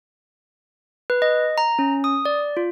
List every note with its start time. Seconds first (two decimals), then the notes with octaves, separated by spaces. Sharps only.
1.10 B4
1.22 D#5
1.58 A#5
1.79 C#4
2.04 D#6
2.25 D5
2.57 F4